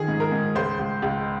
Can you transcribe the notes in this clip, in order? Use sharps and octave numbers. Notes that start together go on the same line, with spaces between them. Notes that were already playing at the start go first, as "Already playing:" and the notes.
Already playing: D#3 F3 G#4
G#2
A#4
G#2
C#2 C5
C#2
C#2